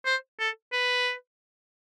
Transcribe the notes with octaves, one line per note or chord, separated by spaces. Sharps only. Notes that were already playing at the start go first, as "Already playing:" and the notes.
C5
A4
B4